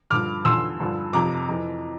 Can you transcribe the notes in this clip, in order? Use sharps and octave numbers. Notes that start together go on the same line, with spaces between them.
G2 D3 F3 D6 F6
E2 D3 F3 C6 E6
G2 D3 F3
F2 C3 F3 A#5 D6
F2 E3